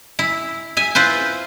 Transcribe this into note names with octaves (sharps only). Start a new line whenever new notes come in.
E4
E5 G#5
E4 F4 B4 C5